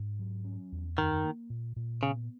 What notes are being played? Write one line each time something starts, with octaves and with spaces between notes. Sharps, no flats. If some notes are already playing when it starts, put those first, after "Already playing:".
Already playing: G#2
F#3
C#4
E2
F#2 D#3
A#3
A#2
A#2
C#3 B3